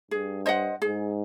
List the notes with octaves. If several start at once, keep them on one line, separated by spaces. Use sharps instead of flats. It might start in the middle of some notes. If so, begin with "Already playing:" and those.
G2 G#4
C5 D#5 F#5
G#2 G#4